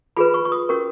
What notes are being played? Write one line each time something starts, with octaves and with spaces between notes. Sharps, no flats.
F4 G#4 B4 B5
C#6
C#6
D#6
C#4 F#4 A#4 C#6